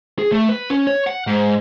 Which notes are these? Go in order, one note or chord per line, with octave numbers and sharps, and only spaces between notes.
G#4
A3
B4
C#4
C#5
F#5
G#2